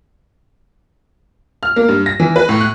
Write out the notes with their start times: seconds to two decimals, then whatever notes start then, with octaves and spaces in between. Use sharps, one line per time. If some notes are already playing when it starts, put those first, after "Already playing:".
1.63 F6
1.76 A#3
1.88 G2
2.06 A#6
2.20 E3
2.36 B4
2.49 A2
2.61 F#6